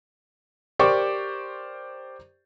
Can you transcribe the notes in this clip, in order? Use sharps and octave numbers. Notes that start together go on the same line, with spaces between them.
G4 A#4 C5 D5 C#6